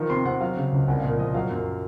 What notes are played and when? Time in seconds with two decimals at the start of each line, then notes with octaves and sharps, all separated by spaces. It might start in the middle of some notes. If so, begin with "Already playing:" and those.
Already playing: D#3 F3
0.10 C3 C6
0.25 C3 F#5
0.41 F#3 F5
0.57 C#3
0.72 C#2
0.88 C2 F#5
0.99 F5
1.03 A#2 D#5
1.19 F3 D#5
1.34 F#3 F5
1.51 F#2